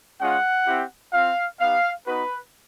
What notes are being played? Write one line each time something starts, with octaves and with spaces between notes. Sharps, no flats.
G#3 C#4 F4 F#5
C4 E4 G4
C4 F4 F5
B3 D#4 G4 F5
B3 D#4 F#4 B4